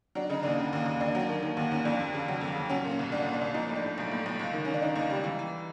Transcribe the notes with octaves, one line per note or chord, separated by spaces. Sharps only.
F#3 D4
C#3 D#4
D#2 D4
C#3
D#2
D#2
D#2 D4
F#3
D#3
D#3
D#2
D#2 C#4
F2 D4
F2
C#3
F#3
F2
C#3
F#3 C#4
A#2
C#4
C2
C2 D4
A#2
D4
C2
F3 D#4
A2
D4
A2
B1
A2
B1
C#2
D#3
D#3 C#4
D4
D#3 D#4
C#2
G3
E3
E3